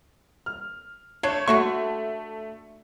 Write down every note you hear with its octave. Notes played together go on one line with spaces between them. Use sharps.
F6
A3 D4 C#5
D3 A3 F#4 C#6